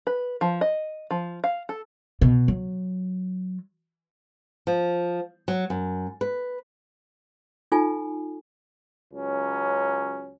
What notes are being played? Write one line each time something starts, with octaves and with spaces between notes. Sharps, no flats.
B4
F3
D#5
F3
F5
A4
B2
F#3
F3
F#3
F#2
B4
D#4 F4 A4 G#5
C#2 F#3 C#4